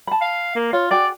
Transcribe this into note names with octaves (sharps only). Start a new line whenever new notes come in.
A5 B5
F5
A#3
F4 C#5
F#4 G#4 D5 G5